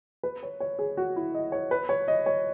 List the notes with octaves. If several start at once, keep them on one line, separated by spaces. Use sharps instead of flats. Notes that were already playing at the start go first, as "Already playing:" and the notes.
B4
C#5
C#5
G#4
F#4
E4
D#5
C#5
B4
C#5
D#5
C#5